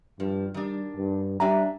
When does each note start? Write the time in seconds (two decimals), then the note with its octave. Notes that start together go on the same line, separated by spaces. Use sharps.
0.20 G2 F3
0.54 D#3 G3 D4
0.97 G2
1.40 G3 D4 E5 G#5 A#5